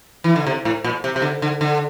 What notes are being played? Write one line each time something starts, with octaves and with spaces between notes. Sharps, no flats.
E3
D3
C3
A2
A#2
C3
C3
D3
D3
D3